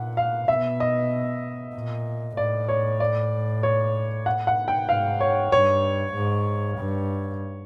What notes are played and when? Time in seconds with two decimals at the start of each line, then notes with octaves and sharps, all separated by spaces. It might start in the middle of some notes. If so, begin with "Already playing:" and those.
Already playing: A#2 F#5
0.17 F5
0.48 B2 E5
0.80 D#5
1.74 A#2
2.37 A2 D5
2.69 C#5
3.00 D5
3.63 C#5
4.26 F#5
4.47 F#5
4.68 G5
4.89 G#2 F5
5.21 C#5
5.52 G2 C#5
6.15 G#2
6.78 G2